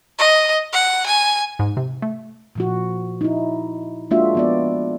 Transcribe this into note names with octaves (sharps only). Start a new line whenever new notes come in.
D#5
F#5
G#5
G#2
C3
A3
A#2 F3 F#4
D#4 E4
G#3 A#3 D4 F4 F#4 E5
F3 B3 D5